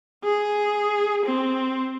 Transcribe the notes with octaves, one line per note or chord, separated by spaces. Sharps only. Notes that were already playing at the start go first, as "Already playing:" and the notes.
G#4
C4